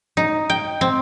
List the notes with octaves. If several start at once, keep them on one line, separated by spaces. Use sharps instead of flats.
D#4
G5
C4